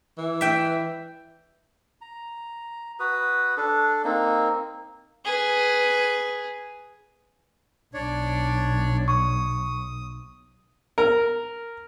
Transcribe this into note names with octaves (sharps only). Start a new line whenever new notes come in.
E3
E5 G5
A#5
F#4 B4 D#6
D4 A4
A#3 C4 D#4
G#4 B4
B1 D4 C#5 D5
C#6 D#6
A#4